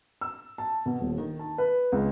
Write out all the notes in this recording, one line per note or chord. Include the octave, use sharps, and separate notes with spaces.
E6
A5
B2
D#1
D#3
A5
B4
C#2